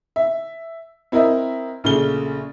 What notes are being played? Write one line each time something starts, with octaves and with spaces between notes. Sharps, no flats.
E5
C4 E4 A#4 D#5 E5
A#1 C#3 A3 G7